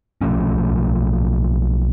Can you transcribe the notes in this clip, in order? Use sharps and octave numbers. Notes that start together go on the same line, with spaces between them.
B1 F3 A3 C#4